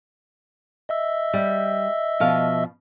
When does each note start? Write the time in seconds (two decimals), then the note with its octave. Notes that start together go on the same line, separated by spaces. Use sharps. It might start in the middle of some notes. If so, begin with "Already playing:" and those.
0.89 D#5 E5 E6
1.34 G3
2.20 B2 F3 F5